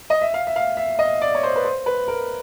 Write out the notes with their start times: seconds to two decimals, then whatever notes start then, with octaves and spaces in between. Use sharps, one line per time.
0.10 D#5
0.21 E5
0.34 F5
0.47 E5
0.56 F5
0.77 E5
0.99 D#5
1.21 D5
1.35 C#5
1.43 C5
1.56 B4
1.65 C5
1.86 B4
2.08 A#4